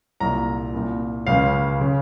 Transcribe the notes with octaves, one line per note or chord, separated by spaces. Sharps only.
C2 A#2 A#5
C2 A#2
C#2 C#3 F5
C#3